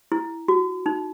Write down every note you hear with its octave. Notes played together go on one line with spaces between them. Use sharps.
E4
F#4
D#4